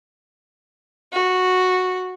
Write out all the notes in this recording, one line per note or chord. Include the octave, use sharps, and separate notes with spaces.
F#4